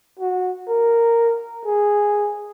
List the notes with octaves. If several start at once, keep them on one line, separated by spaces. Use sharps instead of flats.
F#4
A#4
G#4